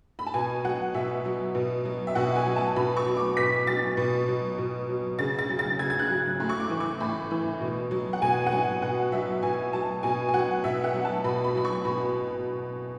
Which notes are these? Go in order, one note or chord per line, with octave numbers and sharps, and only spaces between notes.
B5
A5
B2 G#5
F#3 F#5
B2 E5
F#3
B2
F#3
E5
B2 F#5
G#5
F#3
A5
B2 B5
C#6
F#3
D6
B2 B6
F#3 A6
B2
F#3
B2
F#3
C#3 A6
A6
F#3
A6
C#3 G#6
G#6
F#6
F#3
A2
C#6
D6
E3
C#6
A2 B5
E3
B2
F#3
F#5
B2 G#5
F#5
F#3 G#5
B2 F#5
F#3 E5
B2 G#5
F#3 A5
B2 G#5
G#5
F#3 F#5
B2 E5
F#5
F#3
A5
B2 B5
B5
F#3 B5
C#6
B2 B5